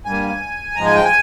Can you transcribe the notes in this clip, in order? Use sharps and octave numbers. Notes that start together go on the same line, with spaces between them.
G2 G3 A#3 G#5
G#2 F3 G#3 A#5
G#5
G5
G#5